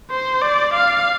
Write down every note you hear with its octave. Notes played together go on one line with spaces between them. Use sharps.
C5
D5
F5